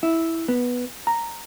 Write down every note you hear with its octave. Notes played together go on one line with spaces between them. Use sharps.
E4
B3
A#5